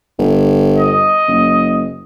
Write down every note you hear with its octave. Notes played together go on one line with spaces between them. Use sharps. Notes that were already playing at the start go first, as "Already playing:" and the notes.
G1
D#5
F#1